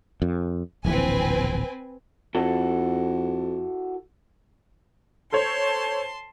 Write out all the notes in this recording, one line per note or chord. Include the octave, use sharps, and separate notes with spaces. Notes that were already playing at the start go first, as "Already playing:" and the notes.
F2
D1 A#1 E3 C4 B4 G#5
F2 E4 F#4 A4
A4 C5 C#5 A5 C6